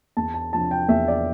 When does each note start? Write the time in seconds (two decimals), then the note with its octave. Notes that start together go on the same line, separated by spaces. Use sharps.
0.17 E2 A5
0.34 A5
0.53 C3 F3 B3 D4 A5
0.71 G5
0.89 E2 E5
1.08 D5